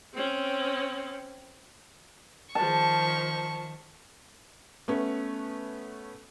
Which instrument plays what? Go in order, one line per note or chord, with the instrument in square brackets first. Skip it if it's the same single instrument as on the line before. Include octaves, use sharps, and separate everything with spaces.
[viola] C4 C#4
[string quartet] D#3 F3 [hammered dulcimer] A5 [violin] C#6
[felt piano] A3 B3 C#4